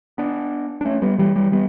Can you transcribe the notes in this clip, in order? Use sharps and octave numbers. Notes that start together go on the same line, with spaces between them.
B3 D4
D4
A3 C#4
G3 B3
E3 G3
E3 G3
G3 B3